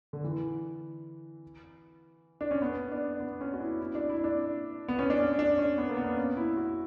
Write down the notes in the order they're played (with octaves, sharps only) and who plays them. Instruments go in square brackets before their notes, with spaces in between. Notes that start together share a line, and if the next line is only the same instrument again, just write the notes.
[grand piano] D3
E3
D4
C#4
B3
D4
B3
C#4
F#4
E4
E4
D4
E4
D4
B3
C#4
D4
C#4
D4
C#4
B3
A#3
B3
C#4
E4
F#4